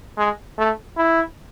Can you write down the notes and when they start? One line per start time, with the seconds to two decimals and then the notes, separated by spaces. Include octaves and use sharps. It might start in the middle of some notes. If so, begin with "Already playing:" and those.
0.18 G#3
0.58 A3
0.97 E4